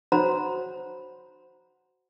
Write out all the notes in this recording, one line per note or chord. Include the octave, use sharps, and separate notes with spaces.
F#4 C5 C#5 F#5 A#5 B5